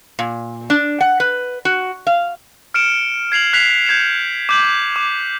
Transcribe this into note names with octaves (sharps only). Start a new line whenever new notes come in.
A#2
D4
F#5
B4
F#4
F5
F6 C#7 D7 E7
G#6 C7 F7 F#7
F#6 B6 C7 F7
G6 G#6 C#7 E7
D6 G6 F#7
D6